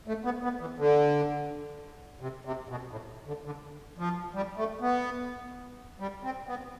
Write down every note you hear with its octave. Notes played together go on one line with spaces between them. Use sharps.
A3
B3
B3
E3
D3
C3
C3
B2
A2
D3
D3
F3
G3
A3
B3
G3
C4
B3